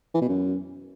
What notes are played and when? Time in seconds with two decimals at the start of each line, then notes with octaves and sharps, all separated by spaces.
0.14 E3
0.21 B2
0.29 F#2